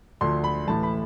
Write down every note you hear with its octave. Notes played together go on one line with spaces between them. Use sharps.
D2 D3 F3 C6
B5
A1 A2 E3 A3 A5
B5